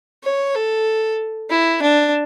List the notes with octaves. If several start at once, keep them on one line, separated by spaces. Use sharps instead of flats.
C#5
A4
E4
D4